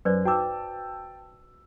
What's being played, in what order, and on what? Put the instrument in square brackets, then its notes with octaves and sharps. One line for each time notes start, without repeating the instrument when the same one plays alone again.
[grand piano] F#2 [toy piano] B4 C5 D5
[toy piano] F#4 D6 [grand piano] G5 A5 E6